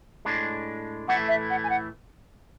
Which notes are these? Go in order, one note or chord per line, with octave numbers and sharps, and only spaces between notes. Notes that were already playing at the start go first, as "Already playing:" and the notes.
A2 G#3 D4
A2 E3 A3 E4 F#5
E5
F#5
G#5
F#5